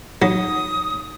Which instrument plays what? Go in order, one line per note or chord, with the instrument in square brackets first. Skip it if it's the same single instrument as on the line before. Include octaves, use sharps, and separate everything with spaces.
[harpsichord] F#3 [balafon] D#4 [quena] D#6